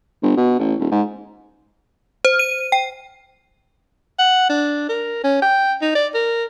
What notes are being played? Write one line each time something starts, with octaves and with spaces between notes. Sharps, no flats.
G1
B2
A1
D#1
G#2
C5
D#7
G5
F#5
D4
A#4
C#4
G5
D#4
D5
A#4